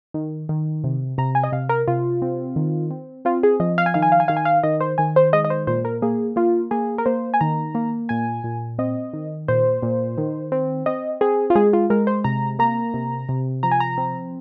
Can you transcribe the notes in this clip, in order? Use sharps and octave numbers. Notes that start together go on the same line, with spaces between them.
D#3
D#3
C3
C3 A#5
G#5
D#5
C3 F5
A#4
C3 F4
C4
D#3
C4
C4 F4
G#4
F3 D#5
F5
G#5
D#3 F5
G#5
F5
G#5
D#3 F5
G#5
F5
D#3 D#5
C5
D#3 G#5
C5
G#3 D#5
D#5
C5
A#2 C5
A#4
A#3 G#4
A#3 F4
A#3 G#4
A#4
A#3 C5
G#5
D#3 A#5
A#3
A#2 G#5
A#2
C4 D#5
D#3
A#2 C5
A#2
D#3
C4
C4 D#5
C4 G#4
F4
G#3 G#4
F4
G#3 A#4
C5
C3 A#5
A#3 A#5
C3
C3
F3 A#5
G#5
A#5
C4